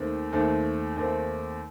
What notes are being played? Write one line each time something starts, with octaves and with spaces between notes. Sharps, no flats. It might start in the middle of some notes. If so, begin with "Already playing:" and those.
Already playing: D#2 D#3 A3 C4
D#2 D#3 A3 C4
D#2 D#3 A3 C4